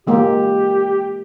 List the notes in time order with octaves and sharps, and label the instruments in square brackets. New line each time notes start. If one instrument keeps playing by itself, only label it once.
[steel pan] E3 G#3 A#3 [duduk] G4